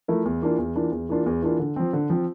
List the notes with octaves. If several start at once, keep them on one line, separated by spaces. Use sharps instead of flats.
F3 A3 E4 A#4
E2
E3 A#3 D4 F4
E2
E3 A#3 D4 F4
E2
E3 A#3 D4 F4
E2
E3 A#3 D4 F4
D3
F3 C4
D3
F3 C4